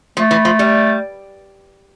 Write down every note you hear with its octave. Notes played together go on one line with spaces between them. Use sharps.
F3 A3
E3
F3
G3